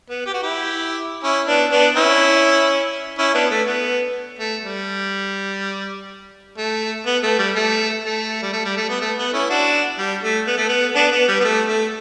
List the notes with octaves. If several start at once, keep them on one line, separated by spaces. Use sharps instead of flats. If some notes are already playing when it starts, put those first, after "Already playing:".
B3
G4
F#4
E4 G4
C#4 E4
B3 D4
B3 D4
C#4 E4
C#4 E4
B3 D4
A3
B3
A3
G3
A3
B3
A3
G3
A3
A3
G3
A3
G3
A3
B3
A3
B3
C#4 E4
D4 F#4
G3
A3
B3
A3
B3
B3 D4
B3
G3
B3
A3
A3